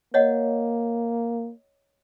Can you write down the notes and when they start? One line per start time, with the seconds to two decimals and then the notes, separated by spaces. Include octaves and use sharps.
0.14 A#3 C#5 D#5 F#5